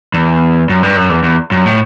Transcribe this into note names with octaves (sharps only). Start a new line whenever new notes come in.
E2
F#2
G2
F#2
E2
E2
F#2
A2